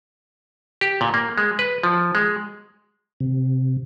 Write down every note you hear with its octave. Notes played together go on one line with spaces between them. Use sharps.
G4
A#2
A#3
G#3
B4
F3
G#3
C3